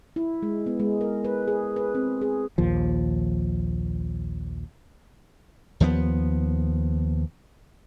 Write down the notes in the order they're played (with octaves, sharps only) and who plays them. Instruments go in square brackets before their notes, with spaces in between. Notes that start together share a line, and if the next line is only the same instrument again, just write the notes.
[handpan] E4
G#3
B3
G#3
A#4
B4
G#4
B4
C4
G#4
[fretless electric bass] A#1 D#2 F3
[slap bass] D#2 F3 G3 B3